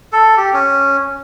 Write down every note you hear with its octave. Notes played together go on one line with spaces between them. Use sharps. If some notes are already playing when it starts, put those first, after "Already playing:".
A4
G4
C#4